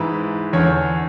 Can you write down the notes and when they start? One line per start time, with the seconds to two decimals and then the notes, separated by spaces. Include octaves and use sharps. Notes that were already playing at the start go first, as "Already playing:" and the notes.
Already playing: G#2 E3 B4
0.53 E2 D3 C#5